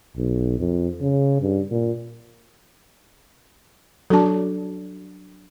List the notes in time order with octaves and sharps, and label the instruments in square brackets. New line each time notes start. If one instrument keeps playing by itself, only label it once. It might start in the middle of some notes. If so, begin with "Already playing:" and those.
[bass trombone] B1
F2
C#3
G2
A#2
[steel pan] F#3 D4 [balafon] A4 A5